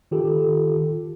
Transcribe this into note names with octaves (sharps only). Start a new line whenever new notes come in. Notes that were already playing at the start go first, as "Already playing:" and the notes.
D#3 F4 G4 A4